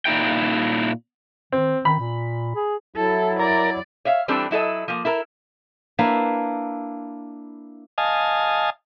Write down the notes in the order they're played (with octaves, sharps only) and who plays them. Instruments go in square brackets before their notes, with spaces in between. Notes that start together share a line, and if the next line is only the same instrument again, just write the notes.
[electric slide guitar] A#2 D#4 E4 G5
[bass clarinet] D#3 [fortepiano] C4
[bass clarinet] D#3 [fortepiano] B5
[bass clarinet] A#2
G#4
[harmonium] F#3 E4 [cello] A4
[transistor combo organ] A#4 [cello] D5
[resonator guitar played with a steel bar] C#5 E5 F5
E3 G3 C4 D4 A4
F#3 E4 A4 D#5
F3 A#3
E4 A4 A#4
[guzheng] A#3 D4 E4 B4 E5
[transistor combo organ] D#5 F5 G#5 A5